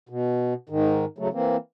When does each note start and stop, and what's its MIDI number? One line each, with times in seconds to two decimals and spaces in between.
0.09 0.54 47
0.69 1.05 44
0.69 1.05 51
1.18 1.29 49
1.18 1.29 54
1.18 1.29 57
1.33 1.56 52
1.33 1.56 58
1.33 1.56 60